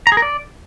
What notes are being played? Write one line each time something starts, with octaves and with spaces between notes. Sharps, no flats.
A#5
G#4
A#4
D5